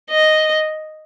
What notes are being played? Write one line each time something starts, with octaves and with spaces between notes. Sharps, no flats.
D#5